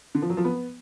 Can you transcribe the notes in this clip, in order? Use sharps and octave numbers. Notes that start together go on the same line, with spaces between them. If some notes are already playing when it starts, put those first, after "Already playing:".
D3
F3
F#3
F3
B3